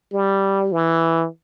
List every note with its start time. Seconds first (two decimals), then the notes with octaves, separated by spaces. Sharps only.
0.13 G3
0.72 E3